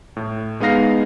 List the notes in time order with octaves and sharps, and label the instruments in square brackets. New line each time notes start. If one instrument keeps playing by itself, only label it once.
[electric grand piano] A2
G#3 B3 D#4 F5 A#6 C7